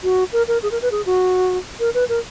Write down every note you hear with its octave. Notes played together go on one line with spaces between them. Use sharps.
F#4
A#4
A#4
G#4
A#4
B4
G#4
F#4
A#4
B4
A#4